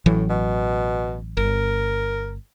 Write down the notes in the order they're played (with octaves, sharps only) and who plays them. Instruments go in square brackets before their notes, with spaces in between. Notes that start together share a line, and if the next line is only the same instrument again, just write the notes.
[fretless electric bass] A1 E3 F#3 [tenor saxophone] A2
[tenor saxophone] B2
[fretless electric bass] G1 [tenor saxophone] A#4